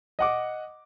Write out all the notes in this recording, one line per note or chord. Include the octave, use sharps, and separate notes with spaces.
D#5 F#5 D6